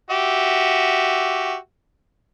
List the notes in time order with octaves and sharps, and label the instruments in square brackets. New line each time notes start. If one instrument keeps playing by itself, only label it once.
[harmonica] F#4 G4 E5